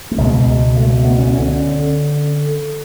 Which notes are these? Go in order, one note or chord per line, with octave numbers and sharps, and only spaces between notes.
A3
C#2 B2 G#3
A3
A3
B3
C#4
D3 C#4